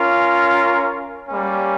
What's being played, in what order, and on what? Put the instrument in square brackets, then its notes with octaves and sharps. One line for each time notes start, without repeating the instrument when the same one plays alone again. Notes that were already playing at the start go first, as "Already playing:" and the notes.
Already playing: [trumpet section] C#4 F4 A#4
G3 A#3 C#4